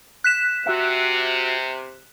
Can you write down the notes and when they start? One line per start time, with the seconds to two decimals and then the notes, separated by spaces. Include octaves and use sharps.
0.24 F#6 B6 E7
0.66 C3 F#4 E5